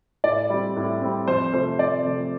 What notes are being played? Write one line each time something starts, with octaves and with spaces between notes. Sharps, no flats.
A2 D5
G3 C4
A2
G3 C4
F2 C5
C3 F3 A3 C5
F2 D5
C3 F3 A3